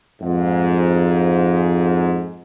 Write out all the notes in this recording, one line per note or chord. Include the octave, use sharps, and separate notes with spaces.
F2 G#2